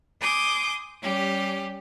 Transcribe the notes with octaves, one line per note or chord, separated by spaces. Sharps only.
G#5 C6 D6 D#6 G6
G3 C#4 G4